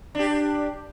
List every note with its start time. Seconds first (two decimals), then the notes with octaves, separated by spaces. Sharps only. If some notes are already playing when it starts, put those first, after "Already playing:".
0.15 D4 G4